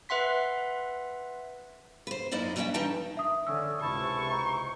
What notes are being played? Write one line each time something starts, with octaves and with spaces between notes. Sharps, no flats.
B4 E5 F#5 C6 B6
B4 C5
F#2 D#4 E4 D5 D#5
F#3 G3 C#4 E4 E5 G5
G2 E3 G3 D#4 G5 A5
E5 D#6
D3 C#4 E6
C#2 C3 E4 A5 C#6
D#4